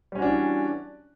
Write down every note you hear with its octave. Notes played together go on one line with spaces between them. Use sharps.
E3 G3 C#4 D4 F#4